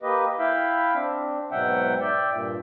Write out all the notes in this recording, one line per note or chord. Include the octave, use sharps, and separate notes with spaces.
A#3 G4 B4 D#5
E4 E5 F5 G5 B5
C4 D4
G#2 B2 F#3 E5 F#5 G5
D5 E5 G5
G2 A#2